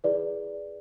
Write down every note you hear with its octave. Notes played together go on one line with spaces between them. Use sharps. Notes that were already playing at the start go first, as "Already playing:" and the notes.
E4 G#4 B4 D5